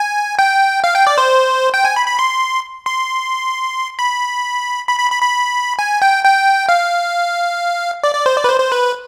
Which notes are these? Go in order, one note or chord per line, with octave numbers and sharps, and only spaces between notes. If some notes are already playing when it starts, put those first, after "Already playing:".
Already playing: G#5
G5
F5
G5
D5
C5
G5
G#5
B5
B5
C6
C6
B5
B5
B5
B5
B5
G#5
G5
G5
F5
D5
D5
C5
D5
B4
C5
C5
B4